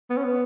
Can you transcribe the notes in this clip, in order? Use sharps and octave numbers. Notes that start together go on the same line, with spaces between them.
B3
C#4
B3